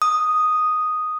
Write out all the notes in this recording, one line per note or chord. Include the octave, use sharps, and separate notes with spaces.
D#6